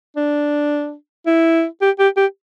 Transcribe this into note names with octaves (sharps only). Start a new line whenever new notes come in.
D4
E4
G4
G4
G4